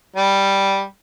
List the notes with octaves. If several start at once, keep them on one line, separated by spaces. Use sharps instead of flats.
G3